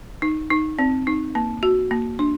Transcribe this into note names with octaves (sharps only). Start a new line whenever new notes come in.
D#4
D#4
C4
D#4
A#3
F#4
A#3
D4